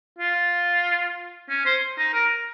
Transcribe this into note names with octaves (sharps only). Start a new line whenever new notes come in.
F4
C#4
C5
D#4
A#4